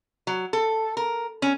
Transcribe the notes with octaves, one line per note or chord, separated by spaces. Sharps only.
F#3
A4
A#4
C#4